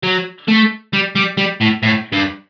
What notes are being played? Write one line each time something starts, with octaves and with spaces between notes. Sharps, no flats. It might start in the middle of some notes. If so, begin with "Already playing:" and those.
F#3
A3
G3
G3
G3
A2
A2
G2